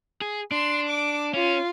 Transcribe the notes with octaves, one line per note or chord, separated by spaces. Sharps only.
G#4
D4 C6
D6
C#4 F4